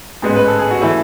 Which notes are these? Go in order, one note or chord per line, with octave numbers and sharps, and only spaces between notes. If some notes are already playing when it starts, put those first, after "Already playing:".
A1 G#2 G#3 B3
B4
A4
G#4
F#4
E3 A3 E4